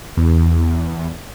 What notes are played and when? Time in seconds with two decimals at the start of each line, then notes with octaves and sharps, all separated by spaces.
0.17 E2